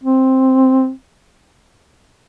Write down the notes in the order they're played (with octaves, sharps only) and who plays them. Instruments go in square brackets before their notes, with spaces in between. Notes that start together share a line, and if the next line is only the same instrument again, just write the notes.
[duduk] C4